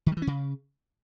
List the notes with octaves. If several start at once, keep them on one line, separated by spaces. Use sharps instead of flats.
D#3
G3
E3
C#4
C#3